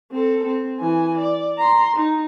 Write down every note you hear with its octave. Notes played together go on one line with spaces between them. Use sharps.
C4 A4
C4
E3 G#5
D5
A#5 C6
D#4